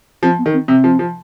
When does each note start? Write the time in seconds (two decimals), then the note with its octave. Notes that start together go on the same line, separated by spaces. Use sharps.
0.23 F3 C4
0.38 B3
0.46 D#3
0.53 C4
0.68 C3 C4
0.84 F3
0.99 F3